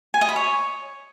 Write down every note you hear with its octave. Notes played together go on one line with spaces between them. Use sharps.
G#5
D#5
B5
C#5